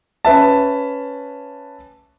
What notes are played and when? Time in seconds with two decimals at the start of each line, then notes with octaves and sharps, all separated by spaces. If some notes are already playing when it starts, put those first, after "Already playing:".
0.25 C#4 B4 E5 A5